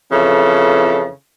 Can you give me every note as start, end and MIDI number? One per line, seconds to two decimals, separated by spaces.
0.11 1.09 41
0.11 1.09 49
0.11 1.09 52
0.11 1.09 69